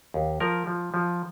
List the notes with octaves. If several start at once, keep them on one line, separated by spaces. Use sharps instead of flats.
D#2
F3 A#4
F3
F3